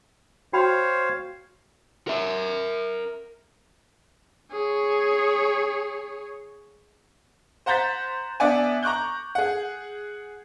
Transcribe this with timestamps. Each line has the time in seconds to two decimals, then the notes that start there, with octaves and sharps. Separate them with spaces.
0.53 F#4 C5 C#5 F5 G5 B5
2.08 A#4 E5
4.52 G#4 C#5
7.66 C5 F#5 A#5 G6 A6 B6
8.40 B3 D4 D5 E5 F#5 G#5
8.83 A#5 C#6 D6 F#6 G6
9.35 G#4 F#5